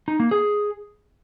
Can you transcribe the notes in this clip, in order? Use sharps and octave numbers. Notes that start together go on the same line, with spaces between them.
D#4
A#3
G#4